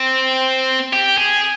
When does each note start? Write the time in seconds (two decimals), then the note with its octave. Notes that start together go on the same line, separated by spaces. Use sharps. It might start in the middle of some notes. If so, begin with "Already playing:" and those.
Already playing: C4
0.93 G4
1.17 G#4